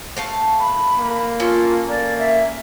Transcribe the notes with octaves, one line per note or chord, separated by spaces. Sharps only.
A3 F5 A5
B5
A#3
C#4 F4 A4
A#3 D5
E5